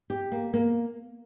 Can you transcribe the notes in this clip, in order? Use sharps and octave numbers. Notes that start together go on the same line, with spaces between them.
G4
A#3
A#3